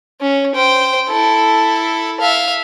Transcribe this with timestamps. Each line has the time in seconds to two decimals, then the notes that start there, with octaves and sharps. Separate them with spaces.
0.21 C#4
0.55 C5 G5
1.09 E4 A4
2.20 E5 F5